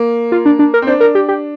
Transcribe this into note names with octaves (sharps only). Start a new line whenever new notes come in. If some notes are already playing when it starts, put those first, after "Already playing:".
Already playing: A#3
F4
D4
D4
A#4
C4
D4 C5
A#4
G4
G4